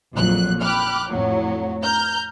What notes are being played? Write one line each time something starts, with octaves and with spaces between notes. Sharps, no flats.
A#1 F2 A#2 F#3 F#6
G5 B5 D6 F6 F#6
F2 A2 F#3
A#5 F6 G6